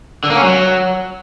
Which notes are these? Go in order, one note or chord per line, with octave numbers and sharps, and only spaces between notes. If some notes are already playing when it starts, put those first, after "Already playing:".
D3
A#3
C#4
F#3